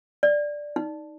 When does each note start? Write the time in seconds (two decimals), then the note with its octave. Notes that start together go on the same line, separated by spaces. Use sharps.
0.23 D5
0.76 D#4